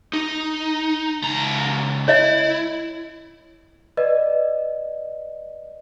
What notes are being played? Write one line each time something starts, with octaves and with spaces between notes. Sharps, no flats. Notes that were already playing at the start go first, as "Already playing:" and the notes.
D#4
C#2 A#5
E4 C#5 D#5 E5
B4 D5 D#5